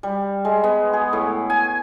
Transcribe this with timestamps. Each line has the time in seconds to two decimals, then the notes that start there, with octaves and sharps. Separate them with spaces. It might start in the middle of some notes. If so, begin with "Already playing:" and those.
0.03 G3
0.45 G#3
0.64 B3
0.93 G#4
1.13 A2
1.50 G#5